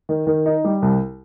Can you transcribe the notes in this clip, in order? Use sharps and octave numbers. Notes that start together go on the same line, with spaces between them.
D#3
D#3
D#4
G3
C2